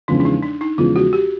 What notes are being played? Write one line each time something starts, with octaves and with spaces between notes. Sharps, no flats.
E2 C#3 F3 G#3 D4
D4
D#4
D4
D#4
E2 C#3 F3 G#3 F4
F#4
G4